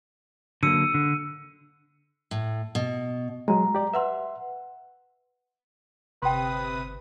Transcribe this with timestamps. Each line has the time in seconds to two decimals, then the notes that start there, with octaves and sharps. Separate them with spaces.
0.63 D3 F#3 A#3 E6 C#7 D#7
0.94 D3
2.31 A2
2.75 B2
3.48 F#3 G#3 A#5
3.75 G4 D5
3.94 B4 E5 F#5 C6
6.22 G1 C3 B4 G5 C6 D#6